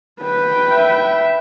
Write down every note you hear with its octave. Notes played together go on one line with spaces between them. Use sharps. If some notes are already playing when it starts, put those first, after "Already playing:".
B4 G5
E5